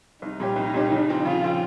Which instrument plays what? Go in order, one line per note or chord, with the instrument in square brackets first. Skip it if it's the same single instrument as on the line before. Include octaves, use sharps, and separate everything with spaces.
[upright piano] C2 [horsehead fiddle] D#4
[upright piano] A#2 G3 C#4 G4
C2
A#2 G3 C#4 G4
C#3
F3 C4
[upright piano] C#3 [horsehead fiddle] F4
[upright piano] F3 C4